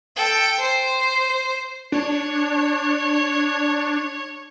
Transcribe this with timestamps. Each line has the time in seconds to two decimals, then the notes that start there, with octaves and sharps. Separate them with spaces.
0.16 A4 G5
0.60 C5
1.92 D4 C#5